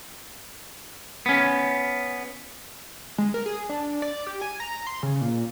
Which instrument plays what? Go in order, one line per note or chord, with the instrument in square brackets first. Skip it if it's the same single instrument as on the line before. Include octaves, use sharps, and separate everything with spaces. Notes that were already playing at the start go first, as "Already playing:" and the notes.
[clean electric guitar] B3 C#4
[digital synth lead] G#3
A#4
G#4
D4
D5
G4
G#5
A#5
C6
C#3
A#2